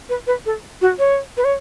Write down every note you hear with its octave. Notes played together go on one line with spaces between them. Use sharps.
B4
B4
A4
F#4
C#5
B4
C#5